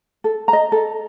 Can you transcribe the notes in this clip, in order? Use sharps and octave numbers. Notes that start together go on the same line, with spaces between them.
A4
A#5
D#5
A4